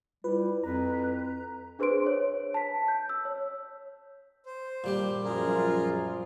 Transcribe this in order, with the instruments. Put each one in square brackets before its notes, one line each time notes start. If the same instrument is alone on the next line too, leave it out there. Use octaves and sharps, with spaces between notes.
[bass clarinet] G3 [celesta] E4 F4 [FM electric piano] B4
[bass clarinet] F2 [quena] B4 [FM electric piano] A#5
[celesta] D4 G#4 B4 C5 C6 D7
C#5
A5 B6
G6
E6
C#5
[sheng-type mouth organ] C5
[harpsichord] A#2 G3 G4
[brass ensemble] F#2 F3 F4 [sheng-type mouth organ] G#4 A#4